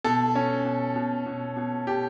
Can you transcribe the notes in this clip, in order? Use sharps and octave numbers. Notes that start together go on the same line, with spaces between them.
B2 A4
C#4
B2
B2
B2
B2
B2 G4